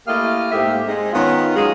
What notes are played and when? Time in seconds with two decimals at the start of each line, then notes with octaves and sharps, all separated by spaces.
0.08 A3 A#3 E4 G4 D#5 F5
0.52 G#2 A3 A#3 G4 C5 E5
0.86 G#3 C4 D#4
1.13 D#3 B3 C#4 F4
1.56 F#3 G#3 D#4 F4 G#4